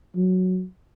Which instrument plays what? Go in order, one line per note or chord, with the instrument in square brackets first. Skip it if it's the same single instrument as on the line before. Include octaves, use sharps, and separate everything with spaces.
[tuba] F#3